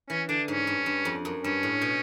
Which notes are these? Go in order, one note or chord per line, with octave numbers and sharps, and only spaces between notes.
E3 C#4
D3 D4
G#2 C#4
G2
G2
F2
F#2
G2 C#4
A2
B2